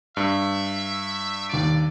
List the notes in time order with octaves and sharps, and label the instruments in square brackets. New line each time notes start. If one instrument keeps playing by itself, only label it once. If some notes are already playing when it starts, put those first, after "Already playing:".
[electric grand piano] G2 [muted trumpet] E5
[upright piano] D#2 D7 [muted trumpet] D5